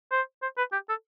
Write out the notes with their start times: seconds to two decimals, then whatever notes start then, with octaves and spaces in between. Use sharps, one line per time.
0.12 C5
0.42 C5
0.58 B4
0.72 G4
0.89 A4